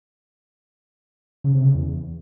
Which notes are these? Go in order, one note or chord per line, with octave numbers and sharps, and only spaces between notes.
C#3
C3
C#3
E2